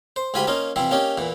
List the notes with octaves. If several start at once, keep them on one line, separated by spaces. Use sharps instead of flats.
C5
D2 G#2 F4 G4 G#5 B5
A#3 C#4 D#4 F4
C3 E3 F3 G3 E4
A#3 C#4 D#4 G4
E2 A#2 E3